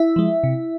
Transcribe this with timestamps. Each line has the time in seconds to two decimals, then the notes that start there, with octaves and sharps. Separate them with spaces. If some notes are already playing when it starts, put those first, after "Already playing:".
Already playing: E4 E5
0.16 F3 G#3
0.44 C3